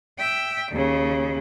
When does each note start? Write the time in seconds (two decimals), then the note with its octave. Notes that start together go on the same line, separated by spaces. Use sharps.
0.19 E5 G5
0.71 D#2 C#3